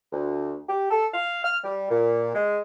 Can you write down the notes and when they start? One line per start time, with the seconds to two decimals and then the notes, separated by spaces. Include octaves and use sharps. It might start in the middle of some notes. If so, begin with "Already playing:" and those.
0.12 D2
0.69 G4
0.91 A4
1.14 F5
1.44 F6
1.64 G3
1.90 A#2
2.35 G#3